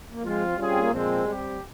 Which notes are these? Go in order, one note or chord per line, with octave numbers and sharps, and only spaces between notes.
A#3
F3 G#3 C4 F4
G3 C#4 F4 G#4
C4
A#3
A#2 F3 G#3 C4
G3 C4 G4